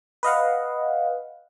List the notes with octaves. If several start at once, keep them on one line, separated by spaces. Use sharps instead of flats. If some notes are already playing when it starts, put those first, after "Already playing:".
B4 D#5 F5 F#5